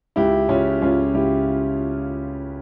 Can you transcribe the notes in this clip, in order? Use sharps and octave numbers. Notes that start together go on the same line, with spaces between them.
C#2 E4 G4
C#3 C#4 F4
C#2 C#4 F4
C#2 E4 G4